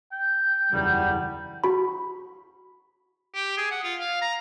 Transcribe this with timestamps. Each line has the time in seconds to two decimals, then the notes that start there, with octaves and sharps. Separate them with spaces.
0.12 G5
0.72 F#1 E2 G3 A#4
1.64 F#4 B5
3.35 G4
3.57 G#4
3.71 F#5
3.84 F4
4.00 F5
4.22 A#5